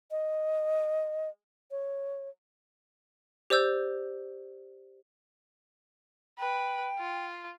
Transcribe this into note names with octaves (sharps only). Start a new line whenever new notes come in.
D#5
C#5
G4 C5 D5 E6 G6
B4 G5
F4